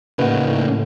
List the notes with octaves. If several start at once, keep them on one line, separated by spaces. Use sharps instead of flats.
D#2 A2 C#3 D#4 B4 F#5